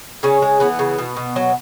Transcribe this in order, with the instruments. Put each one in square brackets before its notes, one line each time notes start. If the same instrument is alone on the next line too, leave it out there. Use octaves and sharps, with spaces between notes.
[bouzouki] C#3 C#4
G#3
E3 B3
C#3
B2
B2
F#3